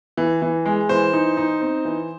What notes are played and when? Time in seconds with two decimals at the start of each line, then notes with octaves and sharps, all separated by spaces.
0.17 E3
0.42 E3
0.66 G#3
0.89 E3 C5
1.13 D#4
1.37 D#4
1.61 C4
1.85 E3